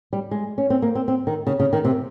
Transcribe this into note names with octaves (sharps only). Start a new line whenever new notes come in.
G3
G#3
C#4
C4
A#3
C4
C4
D#3
C#3
C#3
D#3
C3